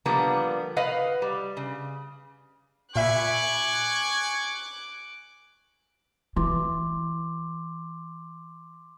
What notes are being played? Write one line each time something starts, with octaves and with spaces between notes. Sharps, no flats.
D3 F3 G3 A#3 B3
B4 D#5 F5 F#5
G3
C#3
A#2 E5 G#5 B5 C#6 D6 F#6
E3 C6 D6